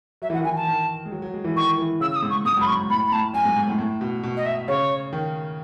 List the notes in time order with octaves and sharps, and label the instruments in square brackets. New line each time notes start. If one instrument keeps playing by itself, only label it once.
[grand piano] F#3 [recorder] E5
[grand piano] E3
[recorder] F#5
[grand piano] D#3
[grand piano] E3 [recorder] G#5
[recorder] A5
[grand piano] D#3
G#3
F#3
F#3
G#3
E3
[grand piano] D#3 [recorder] C#6
[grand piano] E3
[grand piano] C#3 [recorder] E6
[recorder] E6
D#6
[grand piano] G#2
[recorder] C#6
[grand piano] G#2 [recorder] D#6
[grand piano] F#2 [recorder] B5
[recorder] C#6
[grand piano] G#2
[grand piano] A2 [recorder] B5
[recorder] B5
[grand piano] A2 [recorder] A5
[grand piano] F#2 [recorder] G#5
[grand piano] G#2
G#2
A2
A2
B2
B2
[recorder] D#5
E5
[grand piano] C#3 [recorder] C#5
[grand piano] D#3